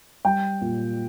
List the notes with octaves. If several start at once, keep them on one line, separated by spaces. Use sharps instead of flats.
G3 G5
A#2